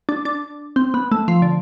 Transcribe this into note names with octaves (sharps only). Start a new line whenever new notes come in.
D4
D4
C4
B3
A3
F3
D3